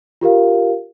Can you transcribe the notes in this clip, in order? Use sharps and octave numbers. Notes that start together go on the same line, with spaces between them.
F4 G4 A#4 F5